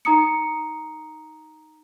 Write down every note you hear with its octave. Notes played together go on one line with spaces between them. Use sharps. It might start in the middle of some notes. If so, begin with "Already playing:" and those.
D#4 A#5 D#6 C#7